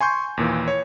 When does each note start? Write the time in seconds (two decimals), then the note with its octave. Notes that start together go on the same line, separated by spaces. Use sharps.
0.01 G#5 C6 C#6 G6
0.37 D#2 A#2 E3
0.68 C#5